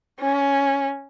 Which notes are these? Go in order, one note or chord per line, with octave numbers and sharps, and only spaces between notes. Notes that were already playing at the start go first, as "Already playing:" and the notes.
C#4